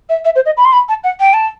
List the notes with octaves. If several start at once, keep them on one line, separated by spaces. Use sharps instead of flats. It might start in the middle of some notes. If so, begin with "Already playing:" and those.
E5
E5
C5
D#5
B5
C6
B5
A5
F#5
G5
A5